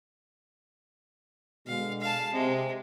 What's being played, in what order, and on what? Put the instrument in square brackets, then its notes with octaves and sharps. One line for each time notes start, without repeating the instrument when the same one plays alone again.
[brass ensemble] B2 D3 G#3 [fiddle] F5
[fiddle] F5 A5
[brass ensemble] C3 [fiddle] G#3